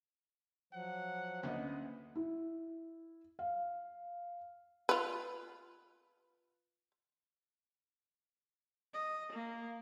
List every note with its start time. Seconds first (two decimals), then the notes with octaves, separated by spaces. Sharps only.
0.73 F3 F#3 F#5
1.43 D2 A#3 B3 C#4 D#5
2.15 E4
3.39 F5
4.89 F4 B4
8.94 D#5
9.32 A#3